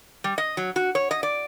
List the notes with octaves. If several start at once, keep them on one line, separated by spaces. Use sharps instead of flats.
G3
D#5
F#3
F#4
C#5
D#5
D5